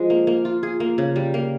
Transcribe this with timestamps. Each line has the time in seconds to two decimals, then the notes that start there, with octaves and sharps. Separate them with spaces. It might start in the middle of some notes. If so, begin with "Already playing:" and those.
Already playing: F3 G#3
0.10 A#3
0.27 A#3
0.45 F4
0.63 G#4
0.80 A#3
0.98 C#3
1.16 G3
1.34 A#3